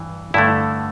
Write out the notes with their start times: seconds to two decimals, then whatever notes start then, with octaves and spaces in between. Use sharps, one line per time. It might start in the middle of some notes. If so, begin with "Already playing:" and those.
Already playing: G2 E3
0.34 G2 D3 A3 E4